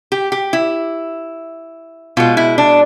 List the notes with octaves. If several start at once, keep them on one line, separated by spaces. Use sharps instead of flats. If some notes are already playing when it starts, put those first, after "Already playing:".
G4
G4
E4
B2 G#3 F4
E4
D4